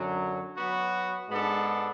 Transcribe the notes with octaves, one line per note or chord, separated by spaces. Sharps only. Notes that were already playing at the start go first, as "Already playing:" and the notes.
Already playing: F#2 D3 F#3
F#3 B3 F#4
G#2 G#3 B3 D4 A4